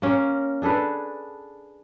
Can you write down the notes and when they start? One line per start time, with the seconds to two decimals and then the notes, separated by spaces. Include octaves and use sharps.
0.02 A#3 C#4 A#4
0.62 D4 G#4 A4 B4